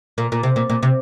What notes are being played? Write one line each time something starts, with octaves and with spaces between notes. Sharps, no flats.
A#2
A#2
C3
A#2
A#2
C3